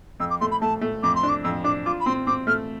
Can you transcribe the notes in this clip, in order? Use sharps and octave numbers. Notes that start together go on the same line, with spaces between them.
F2 E6
D6
A3 C6
B5
A3 A5
A3
F2 D6
C6
D4
D6
F2 E6
D4 D6
F4 D6
B5
C4 C6
C4 D6
A3 F6